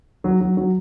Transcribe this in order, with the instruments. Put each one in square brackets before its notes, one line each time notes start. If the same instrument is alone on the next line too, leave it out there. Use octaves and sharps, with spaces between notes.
[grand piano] F#3
F#3
F#3